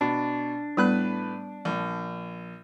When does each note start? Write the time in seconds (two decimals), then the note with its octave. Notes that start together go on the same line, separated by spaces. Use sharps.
0.01 B2 D4
0.77 A2 G3 B3 B4 F#6
1.65 A#1